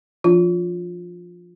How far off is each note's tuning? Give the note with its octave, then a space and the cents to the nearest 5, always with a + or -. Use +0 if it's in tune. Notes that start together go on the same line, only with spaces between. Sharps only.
F3 -5 D4 +0 F4 +20